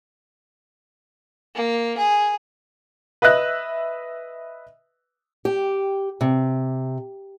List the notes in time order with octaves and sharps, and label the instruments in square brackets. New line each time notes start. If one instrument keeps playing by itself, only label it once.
[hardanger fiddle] A#3
G#4
[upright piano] B4 D#5 E5 F#6
[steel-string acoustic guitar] G4
C3